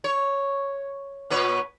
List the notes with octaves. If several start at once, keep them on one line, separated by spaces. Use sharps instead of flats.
C#5
A#2 B4 C#5